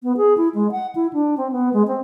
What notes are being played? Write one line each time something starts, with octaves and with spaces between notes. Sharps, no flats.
B3
G#4
E4
G#3
F#5
E4
D4
C4
B3
G#3
C4